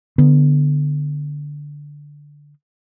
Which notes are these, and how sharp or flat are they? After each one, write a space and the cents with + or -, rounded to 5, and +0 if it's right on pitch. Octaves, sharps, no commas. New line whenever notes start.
D3 +0 B3 +0